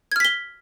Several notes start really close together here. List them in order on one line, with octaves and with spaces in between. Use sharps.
G#6 F6 B6 G7